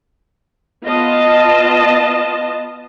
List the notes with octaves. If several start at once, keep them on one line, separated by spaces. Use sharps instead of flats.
B3 F4 D#5 A5